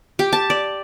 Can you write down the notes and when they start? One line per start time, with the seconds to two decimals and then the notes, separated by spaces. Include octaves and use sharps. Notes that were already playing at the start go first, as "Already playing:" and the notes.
0.19 G4
0.33 A5
0.50 D5